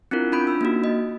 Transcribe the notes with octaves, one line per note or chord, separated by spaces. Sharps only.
C4 D4 E4 F4 A#4
C#4 D4 F4 B5 G6 D7
E6
A#3 D#4 F#4
D#5